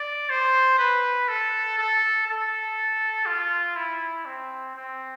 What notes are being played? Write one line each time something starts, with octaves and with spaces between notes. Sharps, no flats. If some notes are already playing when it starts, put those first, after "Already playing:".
Already playing: D5
C5
B4
A4
A4
A4
F4
E4
C4
C4